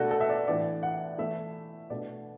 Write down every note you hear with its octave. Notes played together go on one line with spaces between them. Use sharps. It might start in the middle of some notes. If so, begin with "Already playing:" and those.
Already playing: B2 A3 D4 F#4 A4
A4
E5
D5
A2 E3 D4 D5
F#5
E3 A3 E4 E5
B2 A3 D4 D5